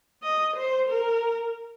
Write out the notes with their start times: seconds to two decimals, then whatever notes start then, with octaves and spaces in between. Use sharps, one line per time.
0.23 D#5
0.56 C5
0.89 A#4